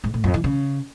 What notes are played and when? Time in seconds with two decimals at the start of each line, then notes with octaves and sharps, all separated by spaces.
0.04 G#2
0.14 A2
0.24 F2
0.34 E3
0.44 C#3